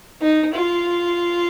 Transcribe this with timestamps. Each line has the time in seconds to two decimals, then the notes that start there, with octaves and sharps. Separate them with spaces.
0.21 D#4
0.54 F4